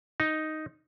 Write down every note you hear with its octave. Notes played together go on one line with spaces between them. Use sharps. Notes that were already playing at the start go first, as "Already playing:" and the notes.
D#4